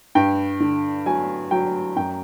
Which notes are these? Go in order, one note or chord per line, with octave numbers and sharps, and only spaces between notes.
G2 G5
D3
F#3 G#5
F#3 G5
F#2 G5